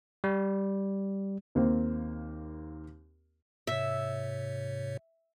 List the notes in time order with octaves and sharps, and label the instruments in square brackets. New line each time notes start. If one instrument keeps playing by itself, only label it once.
[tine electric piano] G3
[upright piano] D#2 A#3 C4
[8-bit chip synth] G#2 C3 C#5 [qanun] E5